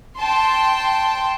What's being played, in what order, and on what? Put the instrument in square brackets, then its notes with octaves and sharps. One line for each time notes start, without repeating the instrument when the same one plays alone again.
[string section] G5 A5 C6